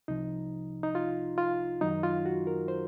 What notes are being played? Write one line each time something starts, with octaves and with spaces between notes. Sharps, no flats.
C2 C3 F3 D#4
D#4
F4
F4
F#2 D#3 F#3 D#4
F4
F#4
A#4
C5